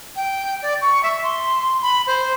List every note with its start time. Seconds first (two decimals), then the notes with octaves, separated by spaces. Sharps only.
0.16 G5
0.62 D5
0.81 C#6
1.03 E5
1.23 C6
1.82 B5
2.07 C5